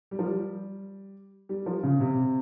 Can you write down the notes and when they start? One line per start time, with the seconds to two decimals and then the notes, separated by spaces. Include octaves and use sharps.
0.11 G3
0.19 F3
0.27 G3
1.49 G3
1.66 F3
1.83 C#3
2.00 C3